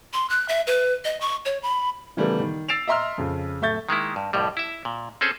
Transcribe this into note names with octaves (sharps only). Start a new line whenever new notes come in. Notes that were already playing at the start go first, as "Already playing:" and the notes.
C6
F#6
E5
B4
D#5
C#6
C#5
B5
C#3 E3 G3 A3 B3 A#4
D#3
E6 A6 C7 D7 E7 F7
D#5 E5 A#5 C6 E6 F6
F2 C#3
D1 A3 E5 C#6 G6 A6
D#3 G#3 A#3 E4
G2
C2 F2 A2 G3
E4 E5
A#2
C4 C#4 G#4 A4 C5